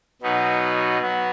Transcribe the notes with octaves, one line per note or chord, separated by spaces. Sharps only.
B2 F#3 B3 D#4
F#3 B3